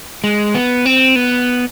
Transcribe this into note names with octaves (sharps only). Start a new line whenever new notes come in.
G#3
B3
C4
B3